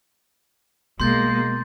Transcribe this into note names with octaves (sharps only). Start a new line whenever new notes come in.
B2 G#3 A#3 C6 G6 A6